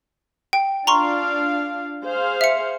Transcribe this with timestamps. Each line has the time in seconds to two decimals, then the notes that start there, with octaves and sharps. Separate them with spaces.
0.53 G5
0.87 D4 F4 F5 A#5 C6 C#6
2.03 G#4 C5 F5
2.41 E5 C#7